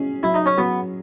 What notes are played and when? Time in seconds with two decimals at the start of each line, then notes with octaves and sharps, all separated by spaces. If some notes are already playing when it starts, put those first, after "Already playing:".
Already playing: F#3 C#4 G#4
0.23 F#3 E4
0.34 D#4
0.46 C#4
0.57 F#3 B3